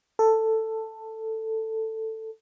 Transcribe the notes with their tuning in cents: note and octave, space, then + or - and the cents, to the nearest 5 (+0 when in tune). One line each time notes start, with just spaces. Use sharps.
A4 +10